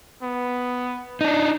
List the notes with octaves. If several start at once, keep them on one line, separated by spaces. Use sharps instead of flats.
B3
D4 D#4